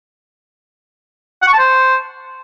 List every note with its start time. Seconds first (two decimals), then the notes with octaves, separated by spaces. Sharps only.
1.42 F#5
1.48 C#6
1.53 A5
1.59 C5